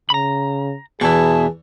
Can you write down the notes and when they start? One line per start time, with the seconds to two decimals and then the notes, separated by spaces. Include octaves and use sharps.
0.10 C#3 A#5 B5
1.01 E2 B2 E4 G#4 A5 C#6